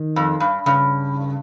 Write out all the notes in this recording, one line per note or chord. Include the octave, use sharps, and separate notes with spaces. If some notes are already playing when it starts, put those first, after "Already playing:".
Already playing: D#3
F2
G2
G2 C#3